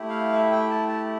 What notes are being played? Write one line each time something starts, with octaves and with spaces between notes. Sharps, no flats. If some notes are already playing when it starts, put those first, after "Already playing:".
Already playing: A3 E4 G4
F5
E5
G5
A5
A5